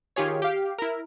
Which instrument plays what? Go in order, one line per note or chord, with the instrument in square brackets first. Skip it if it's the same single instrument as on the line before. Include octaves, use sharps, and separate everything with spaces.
[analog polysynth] D#3 F4 G4 G#4 C#5
G4 F5
E4 A#4